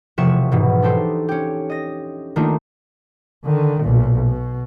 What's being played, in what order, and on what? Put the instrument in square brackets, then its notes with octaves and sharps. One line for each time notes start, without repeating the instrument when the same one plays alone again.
[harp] E1 C3 F3 E5 C#6 E7
G#2 B2 E3
D4 D#4 G4 A4 C5
C#4 G4
D#5 A#6
D#3 A3 A#3 D4 D#4 F4
[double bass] D3 D#3
B1 A#2
B2